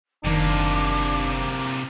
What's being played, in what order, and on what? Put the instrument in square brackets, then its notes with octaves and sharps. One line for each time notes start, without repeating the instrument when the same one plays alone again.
[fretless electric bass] F#1 D#3 [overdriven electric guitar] C3 A#3 [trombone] D4 [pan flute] D6